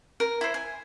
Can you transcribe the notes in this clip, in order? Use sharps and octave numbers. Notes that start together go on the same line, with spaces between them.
A#4
E4 C5
G#5